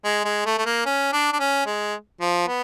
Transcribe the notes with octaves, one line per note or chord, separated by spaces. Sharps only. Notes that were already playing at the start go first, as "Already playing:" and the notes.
G#3
G#3
A3
A3
A#3
C#4
D4
D4
C#4
G#3
F3
B3